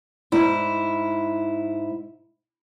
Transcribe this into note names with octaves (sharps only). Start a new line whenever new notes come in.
G#2 E4